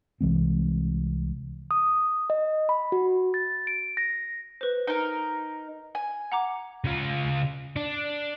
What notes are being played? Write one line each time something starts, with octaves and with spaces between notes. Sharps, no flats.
C2 E3 G#3 C4
D#6
D#5
B5
F#4
A6
D7
A#6
B4 C5
D#4 A#4 B4
G#5
F#5 A#5 D6
C#3 F4
D4